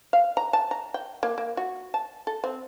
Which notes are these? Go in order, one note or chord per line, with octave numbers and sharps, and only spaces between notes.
F5
A#5
A5
A#5
G5
A#3
A#3
F#4
A5
A4
C4